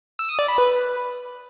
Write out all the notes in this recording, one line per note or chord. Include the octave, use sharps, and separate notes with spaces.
E6
D#6
D5
B5
B4